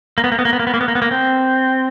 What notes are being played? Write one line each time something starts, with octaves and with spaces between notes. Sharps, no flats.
A#3
B3
A#3
B3
A#3
B3
A#3
B3
A#3
B3
A#3
B3
A#3
C4